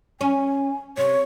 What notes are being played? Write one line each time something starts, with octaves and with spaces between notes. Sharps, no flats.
C#4 G#5
C3 C#5